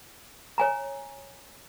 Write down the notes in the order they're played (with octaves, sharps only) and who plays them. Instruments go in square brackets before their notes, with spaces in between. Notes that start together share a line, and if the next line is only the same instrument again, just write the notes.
[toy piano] C#5 G#5 A#5